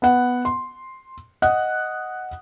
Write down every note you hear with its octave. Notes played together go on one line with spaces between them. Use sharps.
B3 F#5
C6
D#5 F#5 D#6 F#6